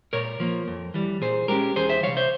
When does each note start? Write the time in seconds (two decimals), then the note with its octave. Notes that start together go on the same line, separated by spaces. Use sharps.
0.13 A#2 A#4 C#5
0.40 F3 A#3
0.67 F2
0.94 E3 G3
1.21 A#2 G#4 C5
1.48 G#3 C#4 G4 A#4
1.76 E2 G#4 C5
1.89 C5 E5
2.03 C3 F3 C#5 F5
2.17 C5 E5